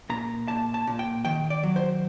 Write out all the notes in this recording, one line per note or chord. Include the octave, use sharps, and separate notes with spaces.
A#2 A#5
A#2 A5
A5
A#2
G5
D#3 G5
D5
F#3
C5